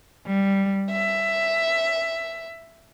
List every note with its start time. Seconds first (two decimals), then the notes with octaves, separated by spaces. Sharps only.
0.26 G3
0.90 E5